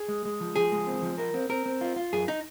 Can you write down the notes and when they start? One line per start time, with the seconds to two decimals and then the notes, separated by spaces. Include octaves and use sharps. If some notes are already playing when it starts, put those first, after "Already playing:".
Already playing: G#4
0.08 G#3
0.25 G#3
0.40 F3
0.56 F3 G#4
0.72 G#3
0.87 C4
1.02 F3
1.18 A#4
1.34 C4
1.49 C4 A#4
1.66 C4
1.81 F4
1.96 F4
2.13 F#2 G#4
2.28 D#4